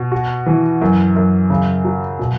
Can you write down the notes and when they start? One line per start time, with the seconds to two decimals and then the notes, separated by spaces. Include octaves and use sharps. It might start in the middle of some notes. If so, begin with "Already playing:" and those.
Already playing: B2
0.12 F#4
0.46 E3
0.81 F#2
1.16 F#2
1.50 C#3
1.85 F#3
2.19 B2